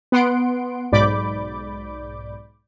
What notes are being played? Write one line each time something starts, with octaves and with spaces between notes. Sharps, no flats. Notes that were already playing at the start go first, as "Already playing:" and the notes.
B3 F#5 C6 D7
B1 G#2 D5 B5 D6 G6